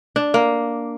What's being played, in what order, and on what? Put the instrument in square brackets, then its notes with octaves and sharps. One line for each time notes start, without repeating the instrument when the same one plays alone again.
[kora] D4
A#3